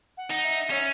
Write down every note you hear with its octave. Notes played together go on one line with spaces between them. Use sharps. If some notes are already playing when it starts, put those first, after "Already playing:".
F#5
D#4
E5
C#4 C#5